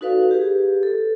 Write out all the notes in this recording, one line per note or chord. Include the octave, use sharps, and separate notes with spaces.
D#4 F#4 A4 B4 D5 F5
G4 G#4 B4
A4